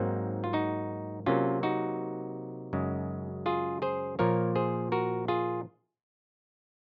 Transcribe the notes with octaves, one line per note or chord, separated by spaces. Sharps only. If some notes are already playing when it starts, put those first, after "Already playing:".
Already playing: G#2 F#3 A#3 C4 D#4
F4
D#4 F#4
C3 F#3 A#3 C#4 F4
D#4 F#4
F#2 C#3 G#3
F4 G#4
G#4 C5
A#2 F3 A#3 A#4 C#5
G#4 C5
F#4 A#4
F4 G#4